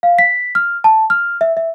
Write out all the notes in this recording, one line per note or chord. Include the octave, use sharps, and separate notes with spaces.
F5
B6
F6
A5
F6
E5
E5